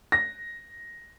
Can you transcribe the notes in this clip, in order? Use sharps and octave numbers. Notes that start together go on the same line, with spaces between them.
A#6